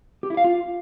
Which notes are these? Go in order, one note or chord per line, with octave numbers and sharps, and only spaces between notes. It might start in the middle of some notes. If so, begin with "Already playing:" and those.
G4
E4
F5
F4